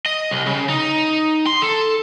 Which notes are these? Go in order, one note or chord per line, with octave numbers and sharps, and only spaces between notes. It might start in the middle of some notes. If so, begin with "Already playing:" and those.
D#5
C2
C#3
D#4
C6
A4